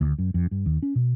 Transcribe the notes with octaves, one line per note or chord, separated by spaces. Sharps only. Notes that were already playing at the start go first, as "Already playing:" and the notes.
D2
F#2
F2
G2
D#2
C#4
B2